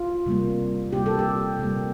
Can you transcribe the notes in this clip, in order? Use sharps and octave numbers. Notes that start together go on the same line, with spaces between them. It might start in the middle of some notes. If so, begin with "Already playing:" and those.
Already playing: F4
C3 G3 A#3
C3 G3 A#3 G4
A4
G4
C3 G3 A#3